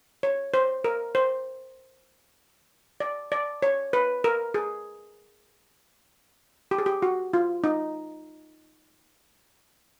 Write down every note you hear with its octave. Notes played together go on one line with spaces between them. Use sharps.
C#5
C5
A#4
C5
D5
D5
C#5
B4
A#4
G#4
G4
G#4
G4
F#4
F4
D#4